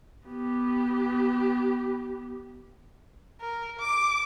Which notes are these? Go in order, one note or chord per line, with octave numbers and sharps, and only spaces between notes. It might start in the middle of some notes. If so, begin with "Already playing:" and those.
B3 G4
A#4
D6